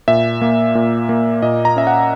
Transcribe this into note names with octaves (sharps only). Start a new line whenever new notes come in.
A#2 E5
A#3
A#2
A#3
A#2 D#5
A#5
C#4 E5
F#5